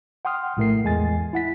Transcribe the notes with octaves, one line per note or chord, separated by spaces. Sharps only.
F#5 G5 C6 D#6 F6
A#1 A2 A3 A#4 C7
E2 G#3 G#5 A6
E4 F#5 B6